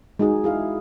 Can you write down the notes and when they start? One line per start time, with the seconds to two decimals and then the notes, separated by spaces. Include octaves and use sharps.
0.19 G#3 D#4 F#4 G#4
0.44 E4 G#4 F5